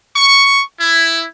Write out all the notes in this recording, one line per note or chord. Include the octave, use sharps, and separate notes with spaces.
C#6
E4